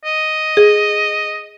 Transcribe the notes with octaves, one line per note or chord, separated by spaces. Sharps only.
D#5
G#4